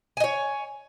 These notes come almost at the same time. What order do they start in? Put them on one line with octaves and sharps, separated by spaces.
G#5 D#5 C#5